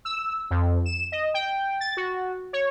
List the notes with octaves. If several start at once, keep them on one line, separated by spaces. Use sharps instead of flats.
E6
F2
E7
D#5
G5
A6
F#4
C#5